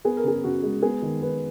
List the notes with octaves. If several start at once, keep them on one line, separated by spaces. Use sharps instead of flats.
B3 G#4
A#4
C#3 G#4
C#3 F#4
G#3
B3 G#4
D#3
D#3 B4